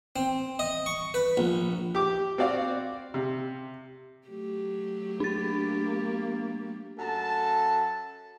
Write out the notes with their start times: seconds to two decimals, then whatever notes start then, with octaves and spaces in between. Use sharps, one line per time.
0.16 C4
0.59 D#5
0.86 C#6
1.14 B4
1.37 A#1
1.95 G4 D6
2.38 C4 F#4 D5 F5
3.14 C3
4.28 F#3 A3 G4
5.20 A#3 D4 A6
6.98 F#2 A4 A5